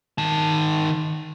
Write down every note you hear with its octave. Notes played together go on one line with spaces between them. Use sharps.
D#3 A5